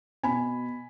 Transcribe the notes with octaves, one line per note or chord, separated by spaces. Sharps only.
B2 G#5 B5